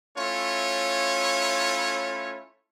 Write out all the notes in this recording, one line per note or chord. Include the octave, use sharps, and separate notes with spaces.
A3 C#4 E4 F4 C#5